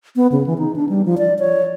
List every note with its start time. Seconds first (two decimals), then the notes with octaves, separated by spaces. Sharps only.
0.16 B3
0.32 C#3
0.47 E3
0.58 D#4
0.76 D4
0.89 G3
1.06 F3
1.18 D5
1.39 C#5